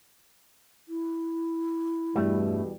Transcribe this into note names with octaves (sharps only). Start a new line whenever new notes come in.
E4
E2 G2 B2 G3 A3